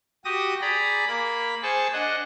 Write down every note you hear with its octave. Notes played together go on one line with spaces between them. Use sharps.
F#4 G4 D#6 A#6
G#4 D5 A#5 B5
A#3 B5
G#4 C5 G#5 A5 C#6
D4 D#5 F#5